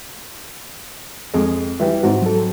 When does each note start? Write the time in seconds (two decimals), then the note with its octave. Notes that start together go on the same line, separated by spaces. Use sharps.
1.34 F2 G#3
1.80 E3 G3 B4
2.03 G#2 C4 F#4
2.22 F#3 A4